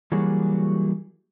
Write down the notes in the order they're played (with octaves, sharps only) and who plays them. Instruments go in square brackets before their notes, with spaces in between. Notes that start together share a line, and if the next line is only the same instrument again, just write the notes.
[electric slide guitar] E3 F#3 G3 A#3 F#4 G#4